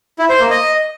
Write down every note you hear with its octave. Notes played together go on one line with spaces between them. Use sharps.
E4
C5
A#3
D#5